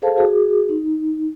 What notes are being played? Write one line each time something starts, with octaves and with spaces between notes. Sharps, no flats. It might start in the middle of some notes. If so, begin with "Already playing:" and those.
G#4 A4 C5 F5 A5
F#4 G#4
D#4